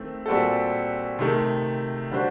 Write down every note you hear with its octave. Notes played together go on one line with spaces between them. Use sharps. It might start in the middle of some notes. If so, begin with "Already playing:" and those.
Already playing: D#3 A3 C4
A#2 G3 C4 F#4 A4
C3 D#3 A3
D3 G3 D4 F#4 C5